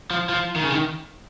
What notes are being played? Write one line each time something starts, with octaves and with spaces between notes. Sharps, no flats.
F3
F3
D#3
C#3
D#3